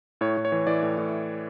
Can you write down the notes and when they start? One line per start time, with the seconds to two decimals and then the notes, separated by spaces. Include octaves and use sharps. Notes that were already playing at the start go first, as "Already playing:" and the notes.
0.21 A2 C#5
0.37 A2
0.45 C#5
0.52 E3
0.67 E3 D5
0.83 A2
0.98 A2